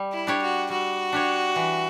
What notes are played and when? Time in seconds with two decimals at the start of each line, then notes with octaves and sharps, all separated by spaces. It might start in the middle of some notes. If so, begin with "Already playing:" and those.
Already playing: G3
0.13 E4
0.27 D4 G4 C#5
0.42 F#4
0.70 G3 F#4
1.13 D4 G4 C#5
1.56 E3